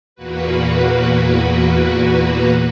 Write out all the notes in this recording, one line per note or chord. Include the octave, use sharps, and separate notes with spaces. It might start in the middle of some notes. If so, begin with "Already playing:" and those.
E2 A#2 A#3 F#4 B4